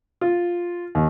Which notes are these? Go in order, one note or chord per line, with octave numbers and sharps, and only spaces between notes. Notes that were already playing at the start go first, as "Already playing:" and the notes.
F4
D#2